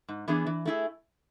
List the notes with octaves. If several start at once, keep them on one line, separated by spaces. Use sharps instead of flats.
G#2
E3 B3 D4 G#4
E3
A3 E4 G#4